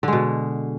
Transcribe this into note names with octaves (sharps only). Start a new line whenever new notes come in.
B2 D3 G#3